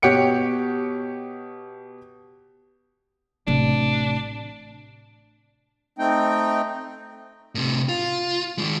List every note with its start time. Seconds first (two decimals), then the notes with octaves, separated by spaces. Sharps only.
0.02 B2 G4 C#5 F#5 C#7 D7
3.47 A1 C3 D4
5.99 A3 C4 D#4 G5
7.55 A2 C3
7.89 F4
8.58 D#3 G#3